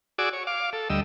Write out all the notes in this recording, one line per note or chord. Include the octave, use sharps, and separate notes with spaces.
F#4 G#4 D5 D6 E6
C#5
F5 D6
A4
D2 G3 D#5 E6